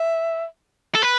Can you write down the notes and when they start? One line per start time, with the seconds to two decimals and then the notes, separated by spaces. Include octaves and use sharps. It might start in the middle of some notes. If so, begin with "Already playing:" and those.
Already playing: E5
0.95 A4
1.03 B4